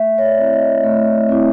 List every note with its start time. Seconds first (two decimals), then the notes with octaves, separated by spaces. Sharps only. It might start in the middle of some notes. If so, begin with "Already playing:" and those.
Already playing: A3 E5
0.18 C#5
0.23 D5
0.38 C4 E4
0.53 D#5
0.83 A3
1.29 C4 E4